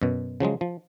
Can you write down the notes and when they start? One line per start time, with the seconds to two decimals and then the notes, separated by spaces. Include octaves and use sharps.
0.02 F#2 B2
0.40 C#3 F3 F#3 G#3
0.61 F3